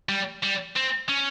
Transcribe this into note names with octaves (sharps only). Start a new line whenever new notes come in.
G3
G3
C4
C#4